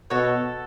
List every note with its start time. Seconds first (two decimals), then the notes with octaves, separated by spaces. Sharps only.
0.10 B2 F#4 A4 C#5